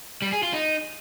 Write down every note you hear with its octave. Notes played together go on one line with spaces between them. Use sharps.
G3
G#4
F4
D#4